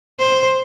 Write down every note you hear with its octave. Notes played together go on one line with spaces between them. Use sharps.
C5